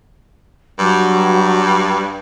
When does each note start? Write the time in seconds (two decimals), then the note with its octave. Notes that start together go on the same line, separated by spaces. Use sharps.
0.79 G2 F#3